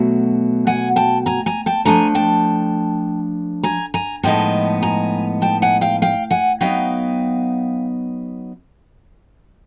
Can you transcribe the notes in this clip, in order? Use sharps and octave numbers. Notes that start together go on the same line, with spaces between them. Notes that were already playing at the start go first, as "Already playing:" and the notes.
Already playing: B2 F#3 A3
F#5 G#5
G5 A5
G#5 A#5
G#5 A#5
G5 A5
F3 A3 D4 G#5 A#5
G5 A5
G#5 A#5
G#5 A#5
A2 F3 G#3 B3 D#4 G5 A5
G#5 A#5
G5 A5
F#5 G#5
F5 G5
F5 G5
F#5 G#5
F#3 B3 D#4 F5 G5